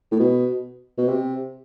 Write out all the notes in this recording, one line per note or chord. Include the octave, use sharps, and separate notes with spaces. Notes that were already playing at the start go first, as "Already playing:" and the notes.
A2
B2
B2
C3